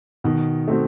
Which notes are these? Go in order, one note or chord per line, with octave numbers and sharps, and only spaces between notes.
B2 D#3
A3 C4 F#4